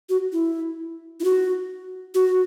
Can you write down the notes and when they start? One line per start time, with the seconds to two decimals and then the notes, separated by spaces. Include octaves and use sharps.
0.09 F#4
0.32 E4
1.20 E4
1.24 F#4
2.15 F#4